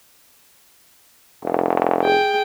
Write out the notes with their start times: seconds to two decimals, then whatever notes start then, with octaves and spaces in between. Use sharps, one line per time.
1.44 F1
2.02 G#4 G5